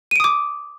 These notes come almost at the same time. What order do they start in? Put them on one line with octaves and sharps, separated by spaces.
D#7 D7 D#6 D6